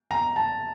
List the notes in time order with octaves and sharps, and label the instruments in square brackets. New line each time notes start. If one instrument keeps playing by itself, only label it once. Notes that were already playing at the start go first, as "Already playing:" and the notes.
[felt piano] A#5
A5